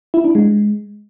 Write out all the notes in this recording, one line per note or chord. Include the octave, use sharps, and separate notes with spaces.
E4
D4
G#3